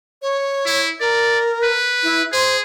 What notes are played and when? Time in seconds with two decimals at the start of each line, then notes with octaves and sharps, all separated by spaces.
0.22 C#5
0.66 E4
1.00 A#4 D5
1.63 B4
2.03 E4
2.32 G#4 C5